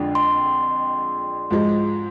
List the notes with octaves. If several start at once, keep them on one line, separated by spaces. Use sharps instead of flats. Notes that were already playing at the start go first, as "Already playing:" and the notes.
Already playing: F2 D3 G#3 D4 F4
C6
G#2 F3 G#3